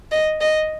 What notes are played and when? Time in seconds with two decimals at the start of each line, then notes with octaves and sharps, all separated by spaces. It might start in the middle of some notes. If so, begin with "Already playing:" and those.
0.11 D#5
0.41 D#5